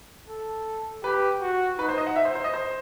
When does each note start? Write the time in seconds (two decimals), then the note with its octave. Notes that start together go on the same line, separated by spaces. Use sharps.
0.28 A4
1.04 G4 B4
1.41 F#4
1.79 D#4 B4
1.89 C5
1.98 D#5
2.07 F#5
2.16 E5
2.25 C5
2.35 C5
2.44 D#5
2.54 C5